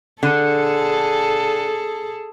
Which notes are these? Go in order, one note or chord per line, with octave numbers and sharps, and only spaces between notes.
D3 G#4 A4